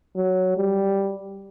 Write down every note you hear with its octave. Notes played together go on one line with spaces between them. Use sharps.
F#3
G3